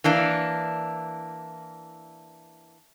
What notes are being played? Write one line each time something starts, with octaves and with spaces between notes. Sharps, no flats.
E3 A#3 D4